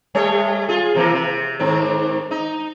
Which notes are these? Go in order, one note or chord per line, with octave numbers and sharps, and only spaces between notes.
G3 A3 C#5
F4 G#4
C3 E3 A#3
C3
G#2 D#3 C4
D#4